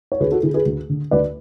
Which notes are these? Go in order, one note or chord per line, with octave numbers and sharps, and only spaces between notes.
C#5
D2 G#4 B4
F#4 A4
D3 E4 G#4
G#4 B4
D2
D3
D2 B4 D5